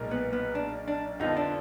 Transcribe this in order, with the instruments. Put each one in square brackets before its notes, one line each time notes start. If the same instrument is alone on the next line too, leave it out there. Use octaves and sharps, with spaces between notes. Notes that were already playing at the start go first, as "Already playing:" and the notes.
Already playing: [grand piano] B1 A#2 G#3 D#4 A#4
[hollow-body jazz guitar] B3
B3
D4
D4
[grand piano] F2 D3 F3 B3 F4 [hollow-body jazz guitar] D#4
[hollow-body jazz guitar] D4